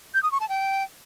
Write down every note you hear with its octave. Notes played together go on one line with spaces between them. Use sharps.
G6
D#6
C#6
A5
G5